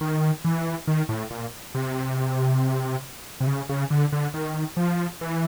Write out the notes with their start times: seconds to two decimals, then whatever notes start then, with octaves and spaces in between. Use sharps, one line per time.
0.01 D#3
0.44 E3
0.87 D#3
1.09 A2
1.31 A#2
1.75 C3
3.40 C3
3.47 C#3
3.69 C#3
3.90 D3
4.12 D3
4.34 D#3
4.77 F3
5.21 E3